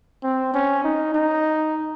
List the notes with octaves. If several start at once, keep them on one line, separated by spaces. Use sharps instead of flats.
C4
C#4
D#4
D#4